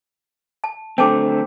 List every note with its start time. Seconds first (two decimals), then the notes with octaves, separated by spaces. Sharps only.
0.64 A5
0.98 D3 A3 C4 G5 A5 D6